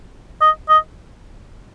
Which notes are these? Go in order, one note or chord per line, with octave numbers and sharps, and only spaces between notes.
D#5
D#5